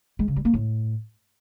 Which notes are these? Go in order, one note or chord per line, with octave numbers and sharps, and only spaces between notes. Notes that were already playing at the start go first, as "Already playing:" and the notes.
G#3
C#3
G3
A#3
A2